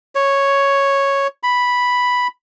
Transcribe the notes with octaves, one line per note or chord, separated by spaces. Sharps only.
C#5
B5